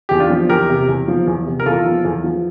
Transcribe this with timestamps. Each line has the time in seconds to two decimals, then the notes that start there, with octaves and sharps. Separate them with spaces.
0.09 E2 G4
0.20 D4 F4
0.30 F3
0.49 E2 G4 A#4
0.69 C3
0.88 E2
1.08 F3
1.27 E2
1.46 C3
1.60 A#4
1.66 E2 F4 A4
1.86 F3
2.05 E2
2.24 F3